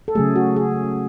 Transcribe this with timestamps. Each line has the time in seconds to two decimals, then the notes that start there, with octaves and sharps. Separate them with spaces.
0.08 A4
0.15 C#3 F#3 A3 G#4
0.36 F#4
0.56 G#4